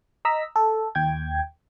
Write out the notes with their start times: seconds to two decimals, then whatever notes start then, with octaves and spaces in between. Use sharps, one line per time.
0.25 D#5 A#5 E6 B6
0.56 A4
0.95 D#2 G5 G#6